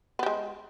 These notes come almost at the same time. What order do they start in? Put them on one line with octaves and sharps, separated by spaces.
B3 G4 G#3